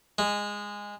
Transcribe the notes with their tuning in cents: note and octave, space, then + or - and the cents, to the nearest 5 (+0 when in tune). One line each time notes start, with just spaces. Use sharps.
G#3 -15